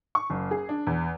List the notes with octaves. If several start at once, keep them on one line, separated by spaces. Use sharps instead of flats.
C#6
F#1
G#4
D4
E2